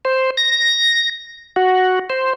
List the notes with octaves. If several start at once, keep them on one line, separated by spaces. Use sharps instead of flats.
C5
A#6
F#4
C5